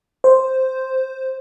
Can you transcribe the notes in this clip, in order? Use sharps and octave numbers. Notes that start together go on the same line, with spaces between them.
C5